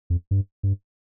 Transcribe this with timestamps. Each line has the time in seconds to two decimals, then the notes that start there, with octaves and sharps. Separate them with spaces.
0.10 F2
0.31 G2
0.63 G2